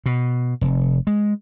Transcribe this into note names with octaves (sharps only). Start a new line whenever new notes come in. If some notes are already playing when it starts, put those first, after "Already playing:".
B2
F1
G#3